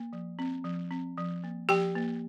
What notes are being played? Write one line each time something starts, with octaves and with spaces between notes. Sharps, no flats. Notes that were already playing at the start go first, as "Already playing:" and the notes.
Already playing: A#3
F3
C4
F3
C4
F3
A#3
F3 G4 G5
A#3